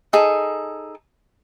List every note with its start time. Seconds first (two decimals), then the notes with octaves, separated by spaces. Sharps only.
0.13 D#4 G#4 A4